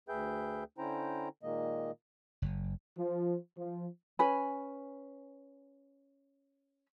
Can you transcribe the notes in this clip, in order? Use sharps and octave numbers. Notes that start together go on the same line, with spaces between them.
D2 G#4 B4 E5 G5 G6
D3 C#4 E4 C5 G5 A#5
A#2 D#3 G#3 A#3 D#5
F#1
F3
F3
C#4 B4 G#5 B5